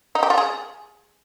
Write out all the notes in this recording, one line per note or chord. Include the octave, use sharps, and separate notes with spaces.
D#4
G4
F4
G#4